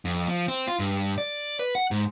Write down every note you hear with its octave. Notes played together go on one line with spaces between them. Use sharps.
F2
F3
C4
F4
G2
D5
B4
F#5
G#2